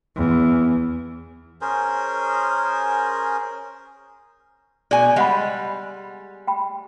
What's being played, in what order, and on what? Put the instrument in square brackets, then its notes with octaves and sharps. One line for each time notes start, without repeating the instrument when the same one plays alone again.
[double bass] E2
[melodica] C#4 G#4 A#4 C5
[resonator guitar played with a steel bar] B2 G#5 [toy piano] G#4 D5
[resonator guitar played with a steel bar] G3 G#3 [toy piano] D#5 F#5 B5
[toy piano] G5 B5